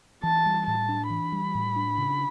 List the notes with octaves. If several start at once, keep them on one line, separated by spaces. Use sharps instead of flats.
E3 A5
G3
A2 A5
D4
E3 B5
G3
A2
D4
C#3